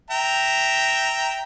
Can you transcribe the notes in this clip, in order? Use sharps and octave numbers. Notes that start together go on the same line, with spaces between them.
E5 G5 A#5